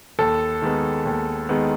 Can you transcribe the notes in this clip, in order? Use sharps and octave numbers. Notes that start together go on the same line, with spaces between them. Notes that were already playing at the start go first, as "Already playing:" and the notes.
D#2 A4
D#3 G#3 B3
D#2
D#3 G#3 B3